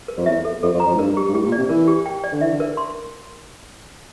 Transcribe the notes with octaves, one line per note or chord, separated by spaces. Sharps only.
A#4
F2
E2 E5
A4
F2 A4
F2
A#5
F2
A2
G2 A#4
G4
G2
A2 G4
A#2
D5
C3
E3 A#4
G4
G5
D5
D3
E3 E5
D3
A#4
C6